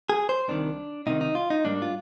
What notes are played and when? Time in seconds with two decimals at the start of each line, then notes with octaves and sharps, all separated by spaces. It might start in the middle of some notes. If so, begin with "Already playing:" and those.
0.09 G#4
0.29 C5
0.48 C2 C3 D#3 D4
1.07 C2 C3 D#3 D#4
1.21 D#4
1.35 F4
1.50 D#4
1.65 G#2 G3 A#3 D4
1.82 F4